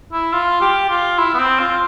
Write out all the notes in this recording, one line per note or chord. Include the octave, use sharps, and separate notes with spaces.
E4
F4
G4
F4
E4
B3
C4
F4